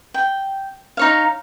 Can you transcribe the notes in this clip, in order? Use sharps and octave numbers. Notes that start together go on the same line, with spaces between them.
G5
D#4 C#5 F5